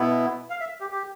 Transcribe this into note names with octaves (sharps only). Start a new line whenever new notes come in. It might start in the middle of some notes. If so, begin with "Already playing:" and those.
Already playing: B2 B3 E4
F5
E5
G4
G4